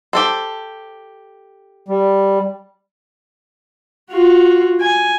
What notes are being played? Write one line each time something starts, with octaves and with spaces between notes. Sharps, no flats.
G4 A4 C5
G3
F4 F#4
G#5